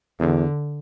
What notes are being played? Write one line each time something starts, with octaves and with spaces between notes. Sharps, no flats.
E2 D3